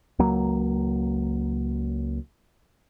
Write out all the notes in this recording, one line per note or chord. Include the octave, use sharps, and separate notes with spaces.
C#2 F#3 A#3